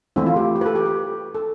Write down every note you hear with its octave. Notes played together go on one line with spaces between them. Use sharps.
E3 A3 C4 E4
F4
G4
G4
B4
A4
G4
G4
A4